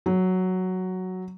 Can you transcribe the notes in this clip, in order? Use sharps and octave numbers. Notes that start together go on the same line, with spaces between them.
F#3